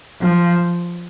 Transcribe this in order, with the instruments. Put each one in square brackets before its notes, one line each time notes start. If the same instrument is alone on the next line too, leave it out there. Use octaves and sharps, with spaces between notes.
[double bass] F3